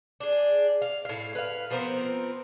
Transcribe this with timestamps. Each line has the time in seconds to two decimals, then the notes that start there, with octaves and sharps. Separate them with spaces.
0.20 D4 G#4
0.82 F5
1.05 A2 F5
1.35 B4 F5
1.71 F3 B3 C4 A#4